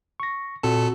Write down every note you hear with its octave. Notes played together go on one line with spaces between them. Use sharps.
C#6 A#6
A#2 C4 F#4 A4 A5